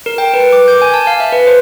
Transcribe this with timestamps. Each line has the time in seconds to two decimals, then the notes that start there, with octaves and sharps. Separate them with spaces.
0.06 A#4
0.18 G5
0.34 B4
0.53 D6
0.68 G6
0.82 G#5
0.94 A5
1.07 F5
1.20 E5
1.32 B4
1.47 C5